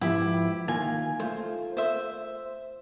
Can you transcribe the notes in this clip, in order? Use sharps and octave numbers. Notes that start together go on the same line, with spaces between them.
G#2 F3 B3 E4 G4
D#3 A#3 F4 G#5
A3 F4 C5
C5 E5